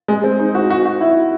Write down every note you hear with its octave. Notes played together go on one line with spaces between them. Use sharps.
G#3
C4
D#4
F#4
F#4
F#4
E4